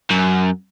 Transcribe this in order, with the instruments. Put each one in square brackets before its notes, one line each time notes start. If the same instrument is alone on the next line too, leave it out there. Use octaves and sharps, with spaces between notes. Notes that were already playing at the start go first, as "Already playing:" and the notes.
[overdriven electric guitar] F#2